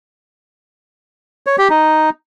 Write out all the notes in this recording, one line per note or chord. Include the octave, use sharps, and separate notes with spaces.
C#5
G4
D#4